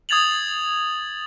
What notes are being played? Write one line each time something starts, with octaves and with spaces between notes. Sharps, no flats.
D#6 G#6 A6 F7 F#7